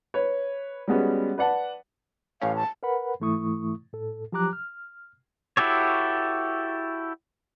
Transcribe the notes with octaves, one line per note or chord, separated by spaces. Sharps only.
B4 C#5
G3 G#3 B3 C#4 F#4
B4 D5 F#5 A5
A1 A2 C#4 F5
A5
A#4 B4 F#5 B5
G#2 E3 A3 E4 C#6 D#6
A2 A4
F3 F#3 G4 A#5 D6 F#6
F6
E4 F#4 G4 A4 C#5